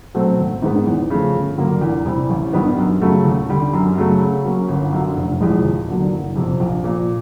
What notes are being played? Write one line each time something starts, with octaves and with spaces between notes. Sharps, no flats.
B2 F#3 A3 C4
G#1
G#2 D#3 G#3 B3
E2
C#3 F3 A3
G1
G2 D3 F#3 A#3
E2
C3 E3 G3
A1
G2 D#3 G3 B3
F#2
C#3 F#3 A3
D#2
D3 G3
F#2
C#3 F#3 A3
C#3
F#3 A#3 C#4
G1
F#2 D3 F#3
F1
E2 C3 F3 G#3
D#2
D3 F#3 A#3 D4
F#1
F2 C3
A#1
A#2 F3